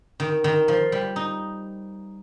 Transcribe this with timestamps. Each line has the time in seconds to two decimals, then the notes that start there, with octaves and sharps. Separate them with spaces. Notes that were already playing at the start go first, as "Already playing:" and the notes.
0.20 D#3
0.44 D#3
0.68 F3
0.92 G3
1.16 D#4